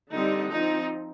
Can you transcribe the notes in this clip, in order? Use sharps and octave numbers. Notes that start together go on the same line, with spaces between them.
D3 G3 C4 D#4
F3 C4 D#4